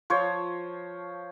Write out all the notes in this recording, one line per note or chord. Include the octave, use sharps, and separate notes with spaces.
F3 C5 C#5